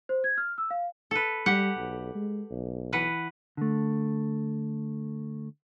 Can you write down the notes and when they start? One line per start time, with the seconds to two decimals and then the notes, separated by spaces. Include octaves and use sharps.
0.09 C5
0.24 G#6
0.38 F6
0.58 E6
0.71 F5
1.11 A4 B4
1.46 G3 G4 F#5
1.77 B1
2.15 G#3
2.51 B1
2.93 E3 B4 F#5
3.57 D3 A3